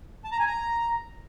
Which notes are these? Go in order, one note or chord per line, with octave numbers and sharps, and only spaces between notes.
A5
A#5
G#5
A#5